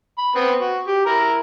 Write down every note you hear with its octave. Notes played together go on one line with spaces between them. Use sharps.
B5
B3 C4
F#4
G4
E4 A#4 A#5